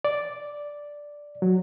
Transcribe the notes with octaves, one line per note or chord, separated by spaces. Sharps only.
D5
F#3